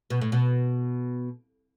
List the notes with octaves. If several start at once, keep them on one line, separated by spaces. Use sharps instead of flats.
B2
A2
B2